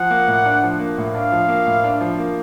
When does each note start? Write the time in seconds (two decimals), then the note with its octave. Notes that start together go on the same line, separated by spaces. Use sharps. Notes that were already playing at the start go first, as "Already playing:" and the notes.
Already playing: F3 F#5
0.10 A#3
0.28 A2
0.46 D4
0.63 F3
0.80 A#3
0.98 A2
1.15 D4 F5
1.32 F3
1.49 A#3
1.67 A2
1.84 D4
2.01 F3
2.18 A#3